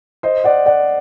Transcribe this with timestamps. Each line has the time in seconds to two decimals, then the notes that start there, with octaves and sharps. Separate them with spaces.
0.23 C5 D#5
0.44 D5 F#5
0.66 D5 F#5